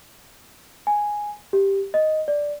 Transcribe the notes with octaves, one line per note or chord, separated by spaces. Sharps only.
G#5
G4
D#5
D5